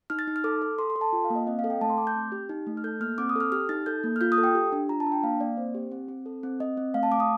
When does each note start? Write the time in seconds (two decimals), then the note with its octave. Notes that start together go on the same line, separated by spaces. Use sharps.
0.10 D#4 F6
0.19 A6
0.28 D#4
0.36 F6
0.44 A4 D6
0.62 A4
0.78 A4 C6
0.90 C6
0.96 A4
1.01 A5
1.13 F4 G5
1.25 F5
1.30 A#3
1.36 D#5
1.47 C4 D#5
1.59 F5
1.64 A4
1.70 G5
1.81 A3 A5
1.90 C6
1.98 A3 D6
2.07 G6
2.15 C4
2.32 G4
2.49 D#4
2.67 A3
2.77 F6
2.84 A4 G6
3.00 A#3 F6
3.18 C4 D6
3.29 D#6
3.36 A4 F6
3.52 G4 F6
3.69 D#4 A6
3.86 A4 G6
4.04 A#3
4.16 F6
4.21 F4 G6
4.32 D#6
4.38 A4
4.44 G5
4.55 G4
4.72 D4
4.89 F4 A#5
5.00 A5
5.07 D4
5.12 G5
5.23 A#3 F5
5.40 A#3 D5
5.57 C4 C5
5.75 G4
5.92 C4
6.08 C4
6.26 A4
6.43 C4
6.60 C4 D#5
6.77 C4
6.94 A3 F5
7.03 A5
7.12 A3 D6
7.20 D#6